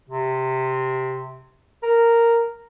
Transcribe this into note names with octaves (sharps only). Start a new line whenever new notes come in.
C3
A#4